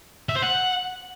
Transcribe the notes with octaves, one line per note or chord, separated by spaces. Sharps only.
E5
C5
F#5